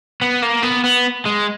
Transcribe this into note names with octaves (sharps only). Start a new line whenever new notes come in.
B3
A#3
B3
B3
G#3